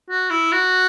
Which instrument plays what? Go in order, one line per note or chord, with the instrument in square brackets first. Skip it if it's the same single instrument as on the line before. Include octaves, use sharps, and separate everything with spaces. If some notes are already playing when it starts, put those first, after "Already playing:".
[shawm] F#4
E4
F#4